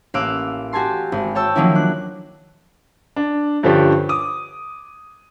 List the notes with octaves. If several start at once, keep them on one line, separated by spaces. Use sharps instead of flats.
A1 A#3 F5 E6 F#6 D7
F#4 G4 G#5 A5 C6
G#1
C#5 G5 A5 E6
D#3 F3 F#3 A#3 C#4 E4
D4 F#6
D4
G2 D3 F3 C#4 G4
D6 D#6